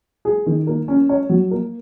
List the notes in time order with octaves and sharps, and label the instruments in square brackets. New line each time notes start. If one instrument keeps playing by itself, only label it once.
[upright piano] G#4
D#3
A#3
C#4
C#5
F#3
A#3